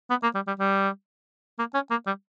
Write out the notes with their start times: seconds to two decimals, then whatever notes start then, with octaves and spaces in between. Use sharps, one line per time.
0.10 B3
0.23 A#3
0.35 G3
0.47 G3
0.59 G3
1.59 A#3
1.74 C#4
1.90 A#3
2.07 G3